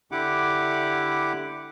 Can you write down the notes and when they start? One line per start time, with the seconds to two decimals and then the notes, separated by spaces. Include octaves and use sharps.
0.12 D3 E4 G4 F#5 D6